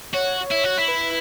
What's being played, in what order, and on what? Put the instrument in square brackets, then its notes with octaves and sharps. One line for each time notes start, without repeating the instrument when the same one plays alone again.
[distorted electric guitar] F#4 [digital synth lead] C#5
[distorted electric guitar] E4
F#4
E4
[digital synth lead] B4